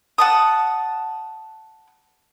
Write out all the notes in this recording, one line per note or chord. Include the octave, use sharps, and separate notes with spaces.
F#5 A5 D#6